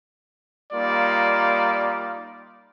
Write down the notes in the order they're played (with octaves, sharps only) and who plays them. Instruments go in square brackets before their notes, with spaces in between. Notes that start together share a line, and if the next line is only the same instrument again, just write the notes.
[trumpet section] G3 A#3 D#4 F4 D5